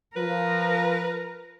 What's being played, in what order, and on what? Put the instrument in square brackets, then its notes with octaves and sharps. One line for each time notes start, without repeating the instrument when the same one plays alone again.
[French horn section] F3 [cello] A#4 [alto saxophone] B4